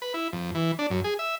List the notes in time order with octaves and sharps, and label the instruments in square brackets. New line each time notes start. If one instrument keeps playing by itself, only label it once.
[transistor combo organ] B4
E4
F2
E3
D4
F#2
G#4
E5